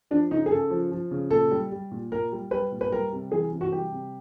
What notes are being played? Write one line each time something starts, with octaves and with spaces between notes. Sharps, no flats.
F3 D4
C#3 D#4
G#4
C#3 A4
F3
F3
C#3
A#2 A4
G3
G3
A#2
A#2 A#4
G3
G3 B4
A#2
B4
G3 A#4
C3
E3 G#4
C3
F#4
G3 G4
C3